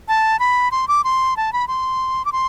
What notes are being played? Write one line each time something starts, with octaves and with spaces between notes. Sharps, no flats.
A5
B5
C6
D6
C6
A5
B5
C6
D6
C6